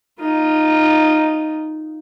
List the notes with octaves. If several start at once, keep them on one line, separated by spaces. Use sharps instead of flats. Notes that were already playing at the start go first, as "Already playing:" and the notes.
D#4 F4